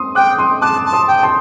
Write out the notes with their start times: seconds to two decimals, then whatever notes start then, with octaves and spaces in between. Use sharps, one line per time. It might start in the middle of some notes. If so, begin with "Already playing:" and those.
Already playing: C6 D#6
0.15 G5 D6 F#6
0.38 C6 D#6
0.61 A5 D6 F#6
0.86 A5
0.93 C6 D#6
1.08 G5
1.23 A5 C6